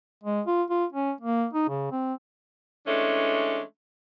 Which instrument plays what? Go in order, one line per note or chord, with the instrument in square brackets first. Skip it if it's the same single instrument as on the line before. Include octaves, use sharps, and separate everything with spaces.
[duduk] G#3
F4
F4
C#4
A#3
D#4
C#3
C4
[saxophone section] E3 G#3 A3 C#4 D4